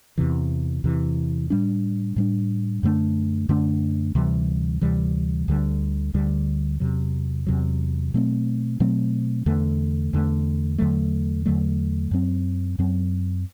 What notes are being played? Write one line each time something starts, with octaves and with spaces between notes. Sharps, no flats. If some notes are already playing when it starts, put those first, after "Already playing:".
E2 C3 E3
E2 C3 E3
A2 G3 D4
A2 G3 D4
F#2 D3 A3 D4
F#2 D3 A3 D4
D2 C3 E3 G3
D2 C3 E3 G3
D2 D3 G3
D2 D3 G3
E2 C3 F#3
E2 C3 F#3
B2 F#3 A3 C4
B2 F#3 A3 C4
E2 D3 A3
E2 D3 A3
E2 D3 F#3 A3
E2 D3 F#3 A3
F#2 F#3 C4
F#2 F#3 C4